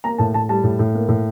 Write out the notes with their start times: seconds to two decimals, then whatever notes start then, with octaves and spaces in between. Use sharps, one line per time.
0.04 A#3 A#5
0.18 A2 A5
0.34 A2 A5
0.49 G3 A5
0.64 A2
0.79 A2
0.95 A#3
1.09 A2